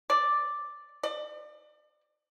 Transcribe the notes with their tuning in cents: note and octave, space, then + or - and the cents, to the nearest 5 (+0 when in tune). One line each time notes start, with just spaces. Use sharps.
D5 +0
D5 +35